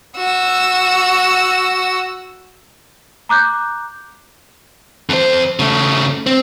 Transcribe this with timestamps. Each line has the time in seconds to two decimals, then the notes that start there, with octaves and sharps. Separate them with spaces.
0.17 F#4 E6
3.29 A#5 D6 F#6 G6
5.09 F2 C5
5.59 C#3 A3
6.26 C4